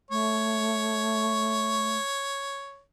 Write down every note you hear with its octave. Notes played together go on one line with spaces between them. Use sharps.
A3 C#5